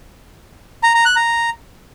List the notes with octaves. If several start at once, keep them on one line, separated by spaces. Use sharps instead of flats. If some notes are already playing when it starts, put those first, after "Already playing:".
A#5
A#5
F#6
A#5